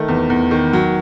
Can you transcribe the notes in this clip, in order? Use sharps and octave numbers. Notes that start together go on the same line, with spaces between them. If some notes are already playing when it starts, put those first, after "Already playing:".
Already playing: D#3 A3
E2
E2
D#3
F#3